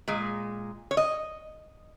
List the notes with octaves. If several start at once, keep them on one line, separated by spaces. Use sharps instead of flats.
A#2 G#3
C#5
D#5